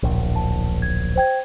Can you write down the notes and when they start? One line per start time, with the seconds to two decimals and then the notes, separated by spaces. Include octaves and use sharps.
0.03 D1 A#1
0.36 A5
0.82 G#6
1.16 C5 G5 G#6